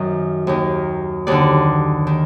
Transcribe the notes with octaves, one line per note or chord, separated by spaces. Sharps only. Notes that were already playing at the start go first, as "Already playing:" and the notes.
Already playing: F#2 D#3 D#5
D#2 D#3
D#2 D3 D5
D#3